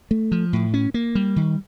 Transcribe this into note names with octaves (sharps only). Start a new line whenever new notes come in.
A3
F3
A2
C#4
A#3
G3
D#3